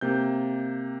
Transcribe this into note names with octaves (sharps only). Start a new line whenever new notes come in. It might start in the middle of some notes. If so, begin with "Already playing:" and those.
C3 A#3 G6